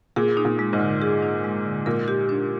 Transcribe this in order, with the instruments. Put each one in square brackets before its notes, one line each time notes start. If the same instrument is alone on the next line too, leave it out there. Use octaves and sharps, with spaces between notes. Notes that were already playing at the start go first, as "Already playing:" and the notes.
[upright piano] A#2 [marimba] G#4
[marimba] D#4
[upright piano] A#2
[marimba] G#3
[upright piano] G#2
[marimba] D3
G#4
D#4
G#3
D3
[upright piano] A#2 [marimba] A#4
[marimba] G4
D4